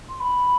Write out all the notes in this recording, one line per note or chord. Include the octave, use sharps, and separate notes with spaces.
C6
B5